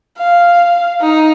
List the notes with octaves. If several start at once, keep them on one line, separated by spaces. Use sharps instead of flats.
F5
D#4